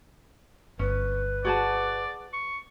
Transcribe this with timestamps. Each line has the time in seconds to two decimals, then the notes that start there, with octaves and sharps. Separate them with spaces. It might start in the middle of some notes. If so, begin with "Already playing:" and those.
0.79 G1 C#4 B4
1.45 F#4 G#4 D5 A5
2.33 C#6